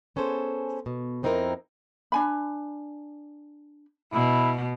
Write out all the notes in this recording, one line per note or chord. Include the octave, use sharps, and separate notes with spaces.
B3 C#4 G#4 A4 C5
B2
F2 C4 D#4 E4 A#4
D4 G#5 B5
B2 E4